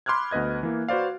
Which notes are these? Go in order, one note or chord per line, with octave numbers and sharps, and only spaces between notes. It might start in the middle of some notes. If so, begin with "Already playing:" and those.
B5 C6 D6 F6 F#6 G#6
D2 B3 B4 D#5 G#6
E3 A#3
F#4 B4 C5 D5 F5